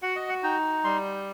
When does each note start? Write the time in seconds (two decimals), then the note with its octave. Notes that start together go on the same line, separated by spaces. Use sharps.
0.02 F#4 F#5
0.16 D#5
0.29 F#5
0.43 D#4 G5
0.84 G3 C6